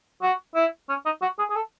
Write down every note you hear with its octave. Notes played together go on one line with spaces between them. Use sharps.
F#4
E4
C#4
D#4
F#4
G#4
G#4
A4